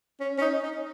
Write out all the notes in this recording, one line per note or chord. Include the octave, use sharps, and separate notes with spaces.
C#4
C#4
D#4
D#4